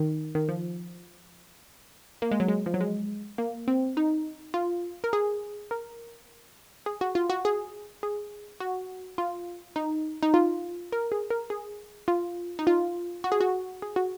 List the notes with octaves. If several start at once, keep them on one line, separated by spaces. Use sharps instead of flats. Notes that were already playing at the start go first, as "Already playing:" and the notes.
Already playing: D#3
D#3
F3
A#3
G#3
F#3
G#3
F3
F#3
G#3
A#3
C4
D#4
F4
A#4
G#4
A#4
G#4
F#4
F4
F#4
G#4
G#4
F#4
F4
D#4
D#4
F4
A#4
G#4
A#4
G#4
F4
D#4
F4
F#4
G#4
F#4
G#4
F#4